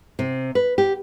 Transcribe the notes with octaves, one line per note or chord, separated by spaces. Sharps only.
C3
B4
G4